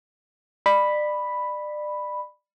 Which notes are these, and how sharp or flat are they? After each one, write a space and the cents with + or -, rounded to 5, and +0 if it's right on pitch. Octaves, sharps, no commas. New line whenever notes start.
D5 +30 B5 +0